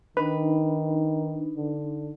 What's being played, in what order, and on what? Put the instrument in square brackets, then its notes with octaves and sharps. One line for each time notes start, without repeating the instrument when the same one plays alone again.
[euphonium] D#3 [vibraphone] D4 D#4 [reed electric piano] B4
[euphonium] D3